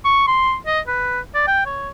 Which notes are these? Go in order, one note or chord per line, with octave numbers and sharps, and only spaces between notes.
C#6
C6
D#5
B4
D5
G5
C#5